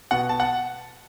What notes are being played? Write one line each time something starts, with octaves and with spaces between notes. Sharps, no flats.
B2 F#5
A5
F#5